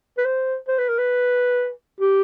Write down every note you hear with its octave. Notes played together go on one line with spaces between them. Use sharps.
B4
C5
C5
B4
A#4
B4
G4